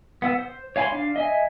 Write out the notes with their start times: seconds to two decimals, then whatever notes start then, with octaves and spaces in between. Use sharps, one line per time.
0.22 B3 F#5 E6
0.39 C5
0.76 C#5 F5 G#5 B5 C6
0.92 D4 F5
1.16 D#5 E5 G#5